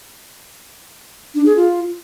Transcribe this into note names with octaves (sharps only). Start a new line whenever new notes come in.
D4
G#4
F4